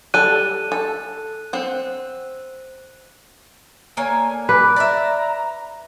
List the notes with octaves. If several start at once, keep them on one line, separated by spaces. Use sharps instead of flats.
G3 A4 F#6 D#7
A4
C4 F#5
D3 A#3 C#5 G#5
B4 D6
D5 E5 A#5